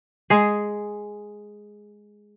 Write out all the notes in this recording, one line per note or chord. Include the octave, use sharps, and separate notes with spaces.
G#3 G#4